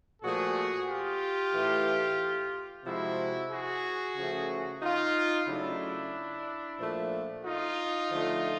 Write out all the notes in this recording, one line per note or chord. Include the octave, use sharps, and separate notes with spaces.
A#2 F3 A3 F#4 G#4
F4 G4
A2 E3 A3
C3 F3 G#3 E4 F#4
F#4 G#4
C#3 F3 A3
D#4 F4
C#3 F#3 A3 D4 E4
A#2 F3 A3
D#4 F4
D3 F3 A3